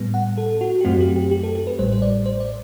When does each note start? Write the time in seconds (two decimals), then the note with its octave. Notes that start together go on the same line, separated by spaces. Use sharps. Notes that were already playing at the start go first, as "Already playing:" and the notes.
Already playing: A2 G3 B3
0.14 F#5
0.38 A4
0.61 F#4
0.81 G4
0.85 F#2 F#3 A3 C4 F#4
1.00 G4
1.16 G4
1.31 G4
1.43 A4
1.55 G4
1.67 B4
1.79 A1 A2 G3 C5
1.93 C5
2.02 D5
2.26 C5
2.40 D5